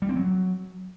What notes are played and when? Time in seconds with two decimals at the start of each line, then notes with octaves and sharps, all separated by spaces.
0.02 G3
0.09 C4
0.16 F#3